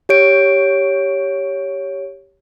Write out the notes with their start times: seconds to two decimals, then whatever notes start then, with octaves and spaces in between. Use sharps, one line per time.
0.09 G4 C#5 D7